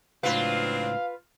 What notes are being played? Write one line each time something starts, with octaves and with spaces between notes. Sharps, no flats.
C#2 A2 F#3 C4 D4 F4 B4 F5